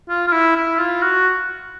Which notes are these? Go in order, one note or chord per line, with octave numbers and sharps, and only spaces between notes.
F4
F4
E4
E4
F4
F#4